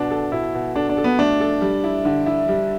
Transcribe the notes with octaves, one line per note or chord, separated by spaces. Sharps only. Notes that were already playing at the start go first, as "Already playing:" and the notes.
Already playing: B2 D4
A4
B2 E4
B2
D4 A4
D4
A4
B3
A3 D4
A4
G3
E4
D3
E4
G3